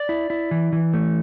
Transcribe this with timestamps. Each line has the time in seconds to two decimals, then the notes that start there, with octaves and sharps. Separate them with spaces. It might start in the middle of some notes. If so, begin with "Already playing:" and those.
Already playing: D5
0.09 E4
0.30 E4
0.51 E3
0.73 E3
0.94 A3